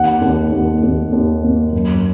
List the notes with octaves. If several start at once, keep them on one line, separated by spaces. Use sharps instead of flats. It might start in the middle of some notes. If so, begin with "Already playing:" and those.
Already playing: D#2 F#5
D#2
D#2
D#2
D#2
A#3
F#2